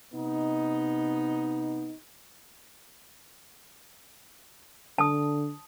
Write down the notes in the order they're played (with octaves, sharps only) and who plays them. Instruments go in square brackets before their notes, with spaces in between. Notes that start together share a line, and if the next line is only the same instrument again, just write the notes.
[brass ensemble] C3 B3 D#4
[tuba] D3 [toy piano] A5 D#6